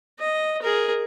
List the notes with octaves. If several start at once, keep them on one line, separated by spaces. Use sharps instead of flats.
D#5
G#4 A#4